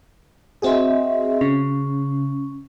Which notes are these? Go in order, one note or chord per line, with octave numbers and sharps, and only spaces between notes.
C4 F#4 G#4 D#5 E5 C6
C#3 C#4